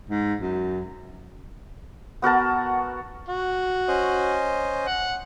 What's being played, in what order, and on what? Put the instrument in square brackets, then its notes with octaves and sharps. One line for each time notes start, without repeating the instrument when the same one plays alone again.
[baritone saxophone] G#2
F#2
[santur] B3 F#4 A#4 A5
[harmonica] F#4
[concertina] C#4 C5 D#5
[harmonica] F#5